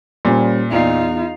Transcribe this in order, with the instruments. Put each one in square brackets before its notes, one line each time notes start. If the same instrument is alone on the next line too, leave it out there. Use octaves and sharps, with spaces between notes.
[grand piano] A#2 [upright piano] G3 C#4 C5
[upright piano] E2 D5 C7 [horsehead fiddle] D#4 F4